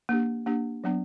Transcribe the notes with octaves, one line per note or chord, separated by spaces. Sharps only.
A#3 D4 G4
A#3 D4 G4
F#3 B3 D4